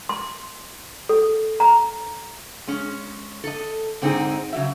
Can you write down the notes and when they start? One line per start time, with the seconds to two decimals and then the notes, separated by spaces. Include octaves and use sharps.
0.09 C6
1.09 A4
1.60 A#5
2.67 G#3 C#4
3.44 A4 D#5
4.02 G#2 D3 C4 D4 D#4 G#4
4.53 C#3 F#3 E5